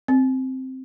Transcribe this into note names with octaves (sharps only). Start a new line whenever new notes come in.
C4